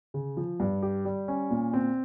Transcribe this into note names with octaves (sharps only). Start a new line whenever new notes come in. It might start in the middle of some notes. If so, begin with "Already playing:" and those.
C#3
F3
G2
G4
G3
C#4
A#2
C4